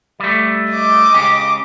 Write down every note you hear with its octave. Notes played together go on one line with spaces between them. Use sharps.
G3 A3
D#5 D6
C#2 C#3 G4